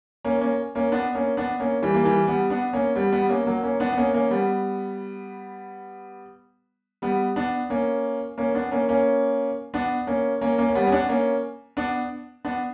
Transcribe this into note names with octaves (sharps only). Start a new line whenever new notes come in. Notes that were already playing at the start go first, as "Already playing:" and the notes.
A#3 C#4
A#3 C#4
A#3 C#4
B3 D4
A#3 C#4
B3 D4
A#3 C#4
E3 G3
A#3
E3 G3
G3 B3
B3 D4
A#3 C#4
G3 B3
G3 B3
A#3 C#4
F#3 A#3
A#3 C#4
B3 D4
B3
A#3 C#4
A#3 C#4
G3 B3
G3 B3
B3 D4
A#3 C#4
A#3 C#4
B3 D4
A#3 C#4
A#3 C#4
B3 D4
A#3 C#4
A#3 C#4
A#3 C#4
C#4
G3 B3
C#4
B3 D4
A#3 C#4
B3 D4
B3 D4